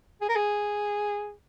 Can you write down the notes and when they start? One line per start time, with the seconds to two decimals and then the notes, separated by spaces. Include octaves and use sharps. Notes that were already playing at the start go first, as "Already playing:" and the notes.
0.21 G#4
0.29 A#4
0.36 G#4